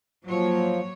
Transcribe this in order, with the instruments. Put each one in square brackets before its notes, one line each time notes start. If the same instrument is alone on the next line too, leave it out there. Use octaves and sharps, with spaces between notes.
[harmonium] F3 [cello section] F#3 A#3 C#5